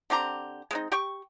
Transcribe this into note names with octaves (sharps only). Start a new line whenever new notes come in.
D3 C4 G4 A#5
G#3 C4 D#4
G4 G5 C#6